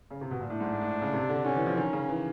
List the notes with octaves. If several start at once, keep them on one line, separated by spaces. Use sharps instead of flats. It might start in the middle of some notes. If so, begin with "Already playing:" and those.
C#3
C3
B2
A#2
A2 D4
G#2
A2
C#3
C3
D3
D3 C#4
E3
F3
D#3 C#4
C#3
E3